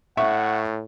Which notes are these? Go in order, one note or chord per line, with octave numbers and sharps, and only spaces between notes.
A2 E5 F#5 C#6